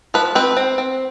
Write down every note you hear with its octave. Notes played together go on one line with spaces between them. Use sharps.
F3 B4
C4 B4
C4
C4